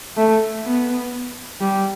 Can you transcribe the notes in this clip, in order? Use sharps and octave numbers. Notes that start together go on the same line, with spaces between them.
A3
B3
G3